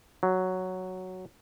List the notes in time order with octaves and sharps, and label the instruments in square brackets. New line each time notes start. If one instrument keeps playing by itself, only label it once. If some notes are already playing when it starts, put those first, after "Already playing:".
[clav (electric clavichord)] F#3